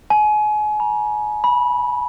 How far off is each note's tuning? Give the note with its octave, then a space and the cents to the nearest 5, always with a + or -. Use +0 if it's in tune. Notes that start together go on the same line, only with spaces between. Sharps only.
G#5 +30
A#5 +40
B5 -20